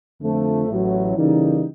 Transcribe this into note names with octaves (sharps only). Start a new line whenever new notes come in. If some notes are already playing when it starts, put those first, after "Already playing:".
F2 D3 F3 A3
A1 A2 F#3
C#3 E3 G3 A#3 D#4